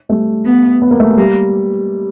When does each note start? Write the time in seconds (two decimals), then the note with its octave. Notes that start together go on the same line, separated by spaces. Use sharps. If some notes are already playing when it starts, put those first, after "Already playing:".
0.09 G3 A3
0.46 B3
0.82 B3
0.91 A#3
1.00 A3
1.09 G#3
1.18 G3 A#3